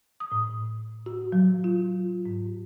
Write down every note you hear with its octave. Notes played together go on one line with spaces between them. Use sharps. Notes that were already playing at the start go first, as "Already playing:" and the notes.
D#6
A2
F#4
F#3
F4
G#2